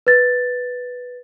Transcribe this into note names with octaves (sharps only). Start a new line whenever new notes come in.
B4 A6